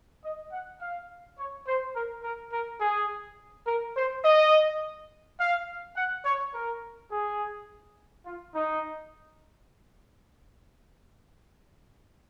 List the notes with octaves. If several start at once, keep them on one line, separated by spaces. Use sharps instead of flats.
D#5
F#5
F5
C#5
C5
A#4
A#4
A#4
G#4
A#4
C5
D#5
F5
F#5
C#5
A#4
G#4
F4
D#4